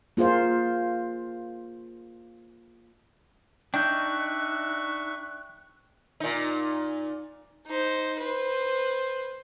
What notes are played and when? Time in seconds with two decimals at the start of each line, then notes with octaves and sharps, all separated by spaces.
0.17 A#3 F4 G#4 C5 F5
3.74 D4 D#4 E5 G5 C#6 F#6 G6
6.20 A#2 D#4
7.66 D#4 C5
8.20 B4 C5